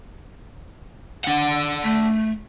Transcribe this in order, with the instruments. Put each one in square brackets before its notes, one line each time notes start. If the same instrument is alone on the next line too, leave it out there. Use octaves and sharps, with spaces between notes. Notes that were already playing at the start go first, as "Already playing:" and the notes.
[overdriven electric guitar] D4 F#5
[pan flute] A3